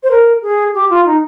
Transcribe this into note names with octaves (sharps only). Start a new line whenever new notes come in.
C5
A#4
G#4
G4
F4
D#4